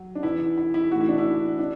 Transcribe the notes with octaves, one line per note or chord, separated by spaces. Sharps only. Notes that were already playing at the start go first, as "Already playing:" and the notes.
Already playing: F#3
D4
E2 E3 E4
E4
E4
A2 E3 F#4
E4
D4
E4
D4